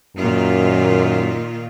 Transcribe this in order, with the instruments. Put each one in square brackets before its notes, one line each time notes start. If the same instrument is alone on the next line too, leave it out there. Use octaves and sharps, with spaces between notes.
[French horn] F#2 [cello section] A#2 D#3 F4